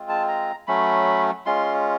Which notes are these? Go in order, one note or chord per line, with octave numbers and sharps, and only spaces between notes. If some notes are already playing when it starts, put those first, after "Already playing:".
Already playing: G#3 C4 F4
A5
A#5
F#3 A3 C#4 B5
G#3 C#4 F4 C6